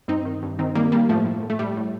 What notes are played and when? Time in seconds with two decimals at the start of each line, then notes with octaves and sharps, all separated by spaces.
0.08 G2 C4 D#4
0.25 D#3
0.43 G2
0.59 D#3 C4 D#4
0.75 D#3 G3 A#3
0.92 G2 G3 A#3
1.09 A2 F3 A3
1.26 A2
1.43 A2
1.50 A3
1.59 A2 G3
1.77 A2